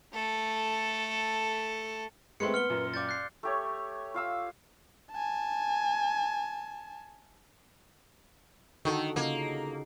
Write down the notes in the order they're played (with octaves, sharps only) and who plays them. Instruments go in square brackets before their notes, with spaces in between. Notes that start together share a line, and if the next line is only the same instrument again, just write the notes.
[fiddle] A3 A4
[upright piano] G#3 A3 C4 [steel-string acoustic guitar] A#4 B4 [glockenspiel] C6 C#7
[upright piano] B3 [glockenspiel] F6 C#7 G7
[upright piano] F#2 A#2
[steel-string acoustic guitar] G4 D5 F5 [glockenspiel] D6 G6 A6
[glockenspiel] F#6 C7
[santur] A3 G4 C#5
F4 F5 E6
[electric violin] G#5 A5
[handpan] D3 F#4 A4 [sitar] D#3
[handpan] C#3 D#4 F4 [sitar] A#3